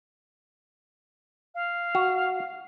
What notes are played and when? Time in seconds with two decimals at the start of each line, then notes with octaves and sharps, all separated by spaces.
1.55 F5
1.95 F#4